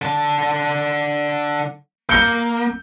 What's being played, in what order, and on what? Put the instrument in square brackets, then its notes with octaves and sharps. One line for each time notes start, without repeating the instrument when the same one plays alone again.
[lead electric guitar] D3 A5
[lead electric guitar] A#3 [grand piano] G6 C#7 G7